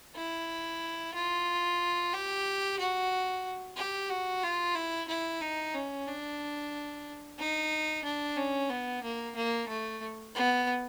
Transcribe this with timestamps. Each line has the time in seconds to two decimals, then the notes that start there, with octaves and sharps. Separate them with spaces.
0.16 E4
1.14 F4
2.13 G4
2.79 F#4
3.77 G4
4.10 F#4
4.43 F4
4.75 E4
5.08 E4
5.42 D#4
5.74 C#4
6.07 D4
7.39 D#4
8.05 D4
8.37 C#4
8.70 B3
9.03 A#3
9.36 A#3
9.68 A3
10.35 B3